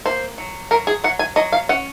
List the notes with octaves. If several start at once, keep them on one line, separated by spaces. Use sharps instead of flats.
A#3 C5
F#3
F#3 A#4
G#4
F#3 F#5
G#5
F#3 D#5
F5
C#4 F#5